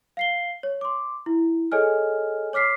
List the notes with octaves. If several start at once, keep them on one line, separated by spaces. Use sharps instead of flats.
F5 C7 G7
C#5
C6 D6
E4
G#4 A4 C#5 D#5 G#5 F6
C#5 D6 F6 B6 C7